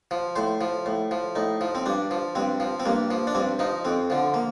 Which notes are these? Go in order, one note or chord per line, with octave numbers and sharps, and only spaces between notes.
F3
A2 C5
F3
A2
F3
A2 D#4
F3
C4
G2 D4
F3
G2 C4
F3
C4
G2 A#3
F3
D4
G2 C4
F3 D#4
F2 C4
D3 F3
A#3